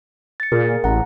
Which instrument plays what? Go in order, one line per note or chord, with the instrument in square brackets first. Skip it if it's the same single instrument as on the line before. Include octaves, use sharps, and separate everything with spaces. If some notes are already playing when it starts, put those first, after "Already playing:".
[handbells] A6 C#7
[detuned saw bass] A#2 [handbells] G#4 A#4
[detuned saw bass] A1 [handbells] F#5 A#5